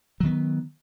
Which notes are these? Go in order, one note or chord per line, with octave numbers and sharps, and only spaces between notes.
D#3 F#3 B3